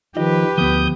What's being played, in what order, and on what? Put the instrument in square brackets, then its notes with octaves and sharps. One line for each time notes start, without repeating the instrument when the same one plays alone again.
[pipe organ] D#3 F3 [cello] G4 B4 [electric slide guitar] D#5
[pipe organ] D2 D#6 G6 [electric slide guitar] F3 B3